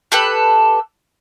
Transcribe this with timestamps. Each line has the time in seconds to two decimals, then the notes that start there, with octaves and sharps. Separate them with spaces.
0.12 G4 A4 B4